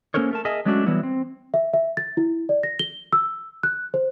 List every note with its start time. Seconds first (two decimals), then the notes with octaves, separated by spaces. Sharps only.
0.14 A#3 C#4 A4 A#4 C5 C#5
0.31 A3 A#4 A5
0.45 G#4 A#4 D#5 E5 G#5 A5
0.65 F#3 G#3 A3 C#4 D4 F#4
0.86 E3 F#3 G3 B3 E4
1.03 C4
1.54 E5
1.73 E5
1.97 A6
2.17 E4
2.49 D5
2.63 A#6
2.79 G7
3.13 E6
3.63 F#6
3.94 C5